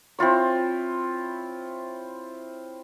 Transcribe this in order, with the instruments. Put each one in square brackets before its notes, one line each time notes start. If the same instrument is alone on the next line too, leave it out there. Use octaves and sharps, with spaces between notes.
[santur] C4 E4 F4 C#5